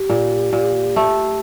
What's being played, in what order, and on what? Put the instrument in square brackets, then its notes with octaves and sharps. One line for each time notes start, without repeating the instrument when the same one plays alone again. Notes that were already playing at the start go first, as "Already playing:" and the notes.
Already playing: [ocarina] G4
[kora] A#2
A#2
A3